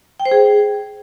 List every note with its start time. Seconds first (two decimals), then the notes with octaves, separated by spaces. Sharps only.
0.20 G5
0.25 C5
0.31 G#4